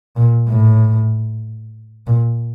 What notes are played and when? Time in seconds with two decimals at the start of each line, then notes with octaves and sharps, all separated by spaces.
0.16 A#2
0.49 A2
2.07 A#2